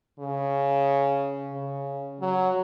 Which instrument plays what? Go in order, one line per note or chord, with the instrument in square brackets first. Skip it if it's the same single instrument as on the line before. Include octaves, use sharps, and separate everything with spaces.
[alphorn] C#3
C#3
F#3